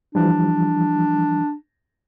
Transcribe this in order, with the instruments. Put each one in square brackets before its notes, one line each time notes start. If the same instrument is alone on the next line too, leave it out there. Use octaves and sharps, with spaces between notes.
[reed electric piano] E3 F3 G3 [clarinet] D4